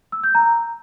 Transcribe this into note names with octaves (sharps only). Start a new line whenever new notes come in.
E6
G6
A#5